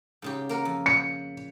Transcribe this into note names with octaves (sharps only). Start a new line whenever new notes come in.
G#2 C#3 G4
A#3 A#4 F#5
F2
C#7